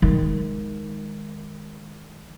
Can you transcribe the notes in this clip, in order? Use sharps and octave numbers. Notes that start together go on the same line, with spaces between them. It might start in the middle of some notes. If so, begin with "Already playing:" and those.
D#3 G#3